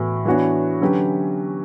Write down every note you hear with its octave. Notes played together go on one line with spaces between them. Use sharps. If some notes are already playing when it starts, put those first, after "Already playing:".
Already playing: A2 E3 B3 F#4
E3 B3 D4 F#4 C#5
D3 F#3 C#4 G4 B4